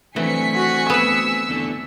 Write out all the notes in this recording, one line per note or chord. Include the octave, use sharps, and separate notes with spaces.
E3 F#3 A3 C4 D4 G#5 B6 C#7
F#4
B3 B4 E6
E2 D3 A3